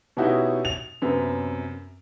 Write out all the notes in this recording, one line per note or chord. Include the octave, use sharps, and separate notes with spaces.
B2 C#4 D#4 E4 F#4 G4
F7
F#2 C3 B3